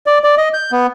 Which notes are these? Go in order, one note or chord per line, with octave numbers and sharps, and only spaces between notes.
D5
D5
D#5
G6
B3